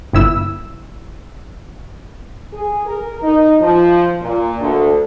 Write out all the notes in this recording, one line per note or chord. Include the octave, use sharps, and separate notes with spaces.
G1 E4 E6
G#4
A#4
D#4
F3
A#2
D2